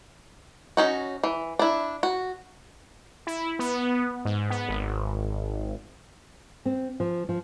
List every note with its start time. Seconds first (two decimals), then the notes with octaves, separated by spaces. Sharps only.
0.77 C#4 D#4 F#4
1.23 E3
1.59 D4 E4
2.03 F#4
3.27 E4
3.59 B3
4.25 G#2
4.50 B3
4.69 G#1
6.66 C4
7.00 F3
7.29 F3